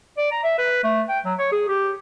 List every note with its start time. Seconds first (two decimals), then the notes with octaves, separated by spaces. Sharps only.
0.18 D5
0.32 A#5
0.44 E5
0.58 B4
0.84 A3
1.09 G5
1.25 F#3
1.39 C#5
1.52 G#4
1.68 G4